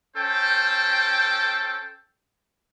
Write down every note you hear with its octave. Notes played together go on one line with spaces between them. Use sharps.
C#4 A4 C5 G5